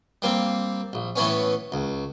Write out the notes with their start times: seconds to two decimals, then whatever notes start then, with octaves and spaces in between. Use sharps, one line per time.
0.22 G3 A#3 C4
0.93 A#1
1.16 A2 E3 B3 C#4
1.72 C#2